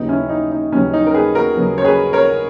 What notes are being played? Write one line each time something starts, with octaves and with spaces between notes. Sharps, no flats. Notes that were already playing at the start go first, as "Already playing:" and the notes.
Already playing: D#2 C#3 F#3 B3 D#4
C#4 E4
D#4
D#4
D#2 C#3 F#3 B3 C#4
D#4
A#4
G#4 B4
F#4 A#4
D#2 C#3 F#3 B3
C#5
G#4 B4
A#4 C#5